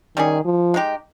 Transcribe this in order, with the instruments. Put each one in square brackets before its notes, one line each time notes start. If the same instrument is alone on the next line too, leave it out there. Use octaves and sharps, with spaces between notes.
[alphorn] D#3 [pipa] G3 C#4 G#4
[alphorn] F3
[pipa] G#3 D#4 G4